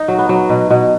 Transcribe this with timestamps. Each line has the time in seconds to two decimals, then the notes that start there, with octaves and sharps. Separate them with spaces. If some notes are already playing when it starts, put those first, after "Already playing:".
Already playing: D#4
0.08 F#3
0.19 B3
0.29 F#3
0.50 B2
0.70 B2